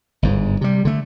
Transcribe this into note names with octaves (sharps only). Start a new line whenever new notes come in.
G1 G#2
C3 G3
D3 A3